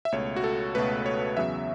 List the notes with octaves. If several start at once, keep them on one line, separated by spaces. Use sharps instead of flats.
E5
C#2 B2 A3 C#5
F#4
A4
C#2 B2 A3 B4
C#5
E2 C#3 F#3 B3 E5